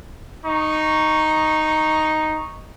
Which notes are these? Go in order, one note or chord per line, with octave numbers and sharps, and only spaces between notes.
D#4 C#6